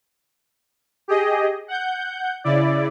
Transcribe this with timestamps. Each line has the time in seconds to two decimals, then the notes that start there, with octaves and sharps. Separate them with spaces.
1.08 G4 G#4 D#5
1.68 F#5 G6
2.44 C#3 E4 D5